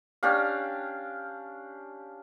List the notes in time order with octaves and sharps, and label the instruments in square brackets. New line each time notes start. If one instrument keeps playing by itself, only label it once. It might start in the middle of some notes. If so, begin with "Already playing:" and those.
[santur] C#4 D4 G4 F5